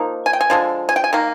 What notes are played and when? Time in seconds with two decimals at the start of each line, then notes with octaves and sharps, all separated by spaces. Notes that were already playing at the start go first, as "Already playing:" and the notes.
Already playing: F3 A#3 D#4
0.26 G#5
0.33 G5
0.41 G#5
0.50 D3 F3 G#3
0.89 G#5
0.96 G5
1.04 G#5
1.13 D#3 A#3